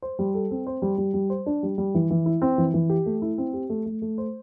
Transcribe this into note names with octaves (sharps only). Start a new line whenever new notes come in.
C5
G3
A4
C4
C5
G3
G3
G3
C5
D4
G3
G3
E3
E3
E4
C4
E3
E3
G4
A3
E4
C4
G4
A3
A3
A3
C5